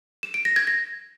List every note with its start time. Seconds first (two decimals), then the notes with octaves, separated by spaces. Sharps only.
0.23 E7
0.34 D7
0.45 A#6
0.56 G#6
0.67 A#6